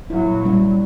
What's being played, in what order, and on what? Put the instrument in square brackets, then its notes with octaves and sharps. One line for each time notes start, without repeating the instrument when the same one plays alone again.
[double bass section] G2 A#2 F#3 [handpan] E4
[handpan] G3 C#4